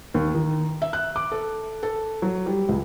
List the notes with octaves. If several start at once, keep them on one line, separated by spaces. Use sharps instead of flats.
D#2
D#3
E5
F#6
D6
A4
A4
F#3
G3
C#2